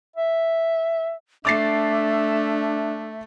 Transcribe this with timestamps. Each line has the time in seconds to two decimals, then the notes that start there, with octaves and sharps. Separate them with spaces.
0.16 E5
1.45 A3 D4 E5 D6 A6 C7